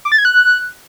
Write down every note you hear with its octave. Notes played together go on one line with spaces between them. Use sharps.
D6
A6
G#6
F#6